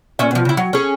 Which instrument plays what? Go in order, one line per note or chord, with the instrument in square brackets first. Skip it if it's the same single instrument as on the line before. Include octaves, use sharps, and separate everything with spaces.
[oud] A#2 C#4 E5
B2 F3
C#3 E4
F#3
C#4 G#4